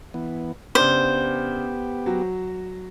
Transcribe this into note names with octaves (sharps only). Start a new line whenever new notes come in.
E3 B3
C#3 B3 D4 G4 C5 D6
F#3 F#4